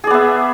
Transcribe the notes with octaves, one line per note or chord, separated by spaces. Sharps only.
B3 G#4 D5 E5